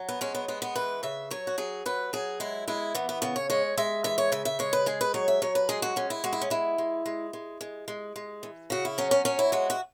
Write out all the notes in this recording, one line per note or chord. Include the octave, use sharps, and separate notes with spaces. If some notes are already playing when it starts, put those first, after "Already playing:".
Already playing: F#3
B3
G#3 C#4
B3
G#3 B3
B3
E3 B4
C#3 E5
F#3 C#5
F#4
F#3 G#4
F#3 B4
F#3 G#4
G#3 E4
G#3 E4
E3 B3
B3
C#3 B3
C#5
G#3 C#5
G#3 E5
E3 E5
C#5
C#3 E5
E5
G#3 C#5
B4
G#3 G#4
B4
F#3 C#5
E5
F#3 C#5
B4
G#3 G#4
F#4
G#3 C#4
E4
G#3 F#4
E4
C#4
G#3 E4
G#3
G#3
G#3
G#3
G#3
G#3
E3
C#3 F#4
E4
F#3 C#4
C#4
F#3 C#4
E4
G#3 F#4
F#4